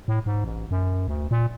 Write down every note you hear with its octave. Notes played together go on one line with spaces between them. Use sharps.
A2
G#2
A1
F#2
D2
A#2